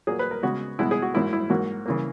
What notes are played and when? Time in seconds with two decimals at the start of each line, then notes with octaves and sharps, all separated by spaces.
0.07 A#2 F#3 A#3 G#4
0.19 B4
0.31 A#4
0.43 C#3 G#3 B3 F#4
0.79 B2 G#3 B3 E4
0.91 G#4
1.02 F#4
1.14 G#2 F#3 A#3 E4
1.33 E4
1.50 G#2 F#3 A#3 F#4
1.86 C#3 E3 A#3